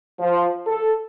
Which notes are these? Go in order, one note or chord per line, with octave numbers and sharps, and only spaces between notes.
F3
A4